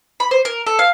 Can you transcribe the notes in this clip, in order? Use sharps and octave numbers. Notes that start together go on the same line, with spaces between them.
B5
C5
A#4
A4
F5